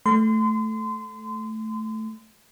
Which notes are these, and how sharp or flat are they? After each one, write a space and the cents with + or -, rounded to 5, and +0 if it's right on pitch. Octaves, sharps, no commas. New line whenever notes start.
A3 -5 C6 -30